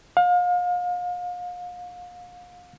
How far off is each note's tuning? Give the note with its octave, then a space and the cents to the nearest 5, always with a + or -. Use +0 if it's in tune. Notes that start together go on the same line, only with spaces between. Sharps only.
F5 +35